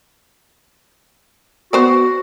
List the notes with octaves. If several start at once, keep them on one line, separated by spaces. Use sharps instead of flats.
B3 F#4 C5 D5